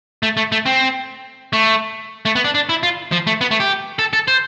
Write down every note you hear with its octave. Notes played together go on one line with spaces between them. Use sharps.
A3
A3
A3
C4
A3
A3
B3
D4
D4
E4
F4
F3
A3
B3
A3
G4
A4
A4
C5